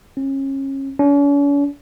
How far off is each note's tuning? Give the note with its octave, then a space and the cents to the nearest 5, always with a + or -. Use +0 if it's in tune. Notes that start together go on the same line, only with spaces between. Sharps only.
C#4 -30
C#4 +45